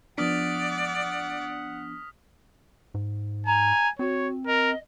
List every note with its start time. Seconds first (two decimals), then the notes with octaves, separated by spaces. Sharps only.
0.18 F3 B3 D4 D5 F#5 D#6 F6 B6
2.94 G#2
3.46 G#5 A#5
3.99 C4 F#4 C#5
4.47 A#4 D#5